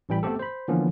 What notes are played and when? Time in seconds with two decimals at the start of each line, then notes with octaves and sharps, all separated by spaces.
0.09 A1 E3 G3 G5 B5
0.23 A3 B3 C4 G4 A4
0.39 C5 B5
0.68 D3 E3 F3 A#3 B3 C#4